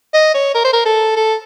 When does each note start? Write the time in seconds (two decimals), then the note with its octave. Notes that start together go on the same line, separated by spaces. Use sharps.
0.14 D#5
0.34 C#5
0.54 A#4
0.64 C5
0.73 A#4
0.86 A4
1.16 A4